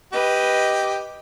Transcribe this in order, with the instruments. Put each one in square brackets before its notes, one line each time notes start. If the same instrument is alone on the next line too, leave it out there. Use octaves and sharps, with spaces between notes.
[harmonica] G4 [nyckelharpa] B4 D#5